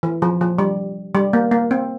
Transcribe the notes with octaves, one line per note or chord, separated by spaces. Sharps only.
E3
F3
F3
G3
G3
A#3
A#3
C4